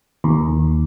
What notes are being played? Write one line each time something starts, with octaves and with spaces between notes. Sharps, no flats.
D#2